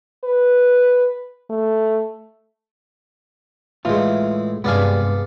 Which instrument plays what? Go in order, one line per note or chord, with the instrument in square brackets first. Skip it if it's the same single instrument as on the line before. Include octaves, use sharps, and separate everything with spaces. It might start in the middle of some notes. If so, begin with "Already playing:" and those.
[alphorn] B4
A3
[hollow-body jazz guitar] A2 F4 [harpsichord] E3 G#3
[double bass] G2 C3 [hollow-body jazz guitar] G#3 G#4 [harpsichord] B3 D5 F5